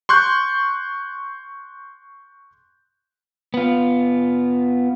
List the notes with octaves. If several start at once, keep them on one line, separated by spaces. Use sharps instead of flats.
C6 C#6 F#6 G6
B3 F4